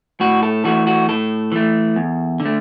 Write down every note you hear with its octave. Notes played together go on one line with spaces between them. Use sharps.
A2 F#4
A4
E3 A3 F#4
F#4
A2 A4
E3 A3
E2
D3
A3